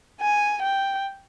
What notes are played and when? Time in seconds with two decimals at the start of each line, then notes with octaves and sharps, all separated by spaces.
0.21 G#5
0.62 G5